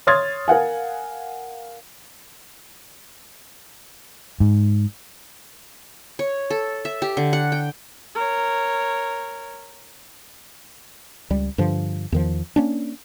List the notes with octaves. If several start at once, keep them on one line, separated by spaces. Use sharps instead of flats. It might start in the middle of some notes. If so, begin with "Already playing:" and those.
C#5 C6 D#6 F6 G#6 A6
A#4 F5 F#5 G#5
G#2
C#5
A4
E5
G4
D3
F#5
G5
A#4 C#5
C#2 G3
G2 D3 F3
E2 D#3 F3
A#3 C#4 D4